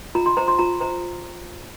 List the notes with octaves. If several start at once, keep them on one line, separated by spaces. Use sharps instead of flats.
F4 A#5
C6
C5 A#5
C6
F4 A#5
C5 A#5